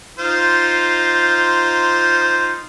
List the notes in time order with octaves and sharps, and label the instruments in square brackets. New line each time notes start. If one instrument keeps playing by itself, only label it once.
[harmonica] D#4 F4 C5